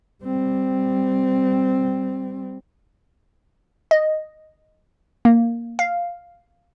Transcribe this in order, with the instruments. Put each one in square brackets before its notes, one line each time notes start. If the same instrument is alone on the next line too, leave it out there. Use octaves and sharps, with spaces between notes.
[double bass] G3 C4
[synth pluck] D#5
A#3
F5